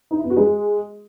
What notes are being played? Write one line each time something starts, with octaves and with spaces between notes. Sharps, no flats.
D#4
E4
B3
F#4
G#3